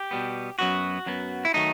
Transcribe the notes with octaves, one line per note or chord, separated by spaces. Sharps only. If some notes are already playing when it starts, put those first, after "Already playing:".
Already playing: G4
B2 G3 B3
F#2 F#3 B3 F#4
F#2 F#3 B3
E4
D#3 F#3 A3 D#4